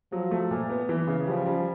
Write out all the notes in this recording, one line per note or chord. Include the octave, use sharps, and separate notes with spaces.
F3 F#3
A3
A#2
B3
E3
C#3
F3 G3
G3